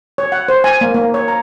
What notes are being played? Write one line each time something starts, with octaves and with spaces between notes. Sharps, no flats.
C#5
F#5
C5
G#5
A#3
A#3
C#5
A#5